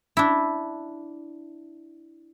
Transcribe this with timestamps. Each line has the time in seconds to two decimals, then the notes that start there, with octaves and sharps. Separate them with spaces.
0.17 D4 E4